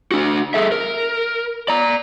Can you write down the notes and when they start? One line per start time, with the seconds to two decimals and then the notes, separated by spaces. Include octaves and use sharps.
0.11 D4 F#4
0.54 G#4 A4 E5
0.72 A#4
1.68 D5 A#5